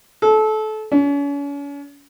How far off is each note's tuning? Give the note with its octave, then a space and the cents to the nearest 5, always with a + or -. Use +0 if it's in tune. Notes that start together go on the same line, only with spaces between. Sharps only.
A4 -25
C#4 +40